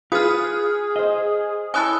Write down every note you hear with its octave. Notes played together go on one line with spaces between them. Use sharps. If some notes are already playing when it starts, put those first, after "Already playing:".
F4 G#4 B4 D#6 F6
C5 D#5
C#4 E4 A4 G#5 D#6 F#6